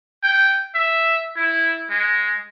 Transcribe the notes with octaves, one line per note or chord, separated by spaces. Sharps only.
G5
E5
E4
G#3